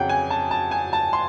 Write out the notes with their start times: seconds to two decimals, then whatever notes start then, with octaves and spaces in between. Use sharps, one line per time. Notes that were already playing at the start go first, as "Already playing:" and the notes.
Already playing: F2 C#3 F#3 F#5 G5
0.09 G#5
0.30 A5
0.51 A5
0.71 G#5
0.93 A5
1.13 C6